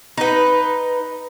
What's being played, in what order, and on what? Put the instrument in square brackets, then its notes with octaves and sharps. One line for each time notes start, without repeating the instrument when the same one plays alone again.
[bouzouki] D#4 B4